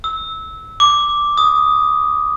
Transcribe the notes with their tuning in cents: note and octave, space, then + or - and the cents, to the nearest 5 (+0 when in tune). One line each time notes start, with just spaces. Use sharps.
E6 -20
D6 +0
D#6 +0